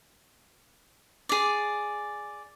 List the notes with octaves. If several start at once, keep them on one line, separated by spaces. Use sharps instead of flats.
G#4 D5